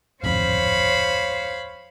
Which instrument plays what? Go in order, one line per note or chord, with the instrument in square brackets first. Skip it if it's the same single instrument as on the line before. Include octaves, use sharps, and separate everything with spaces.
[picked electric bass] D1 G#1 F2 [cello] C5 C#5 [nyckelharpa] F5 B5